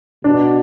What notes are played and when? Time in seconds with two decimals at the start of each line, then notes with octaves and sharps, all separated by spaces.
0.24 B2 D4